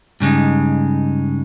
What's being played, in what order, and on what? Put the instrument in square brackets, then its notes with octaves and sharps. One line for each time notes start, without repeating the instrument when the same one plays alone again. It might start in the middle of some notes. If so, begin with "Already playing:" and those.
[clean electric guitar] G2 C#3 G#3 D#4